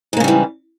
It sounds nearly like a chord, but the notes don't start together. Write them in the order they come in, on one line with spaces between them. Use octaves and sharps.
G#2 A#3 C#3 G3 E3